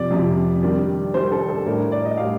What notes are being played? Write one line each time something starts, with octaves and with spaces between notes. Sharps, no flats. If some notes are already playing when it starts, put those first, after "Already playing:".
Already playing: F2 C3 F3 D5
F2 C3 F3
D#3 G3 D4
D#3 G3 D4 C5
A4
A4
A2 G3 D4 A#4
A#4
D5
D#5
A2 G3 D4 F5